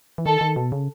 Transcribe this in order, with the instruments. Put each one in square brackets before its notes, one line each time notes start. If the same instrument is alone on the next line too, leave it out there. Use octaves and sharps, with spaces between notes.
[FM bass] E3
[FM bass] D#3 [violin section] A4
[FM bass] D#3
B2
C#3